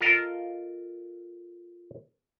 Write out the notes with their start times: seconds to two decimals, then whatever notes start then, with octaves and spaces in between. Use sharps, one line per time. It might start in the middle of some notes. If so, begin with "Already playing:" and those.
0.01 F4 A4 A#4 D#5 F5